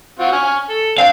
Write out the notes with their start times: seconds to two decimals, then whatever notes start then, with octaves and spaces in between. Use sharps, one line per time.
0.19 C4 F4 F#4
0.32 G#5 C#6 F6
0.69 A4
0.98 C4 D4 F5